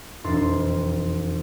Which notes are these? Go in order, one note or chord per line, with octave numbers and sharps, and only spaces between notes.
E1 F2 D#4 C6 E6 A6